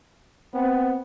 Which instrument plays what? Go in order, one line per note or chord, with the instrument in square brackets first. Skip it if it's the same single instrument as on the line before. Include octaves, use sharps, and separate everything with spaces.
[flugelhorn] B3 [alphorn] C4